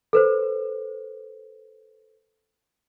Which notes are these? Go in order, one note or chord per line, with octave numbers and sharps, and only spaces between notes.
A4 B4 C5